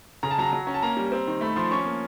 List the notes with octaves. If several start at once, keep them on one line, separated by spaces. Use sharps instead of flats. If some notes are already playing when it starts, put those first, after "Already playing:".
C#3 A#5
A5
F#3 A#5
F#3
C#4
A5
A#3 A#5
G3
C4
D#3
A3 B5
F3 C6
C#4 C#6
A#3